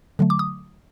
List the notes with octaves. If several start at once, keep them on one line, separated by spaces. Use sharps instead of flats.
D3 F#3 A3
D6
D#6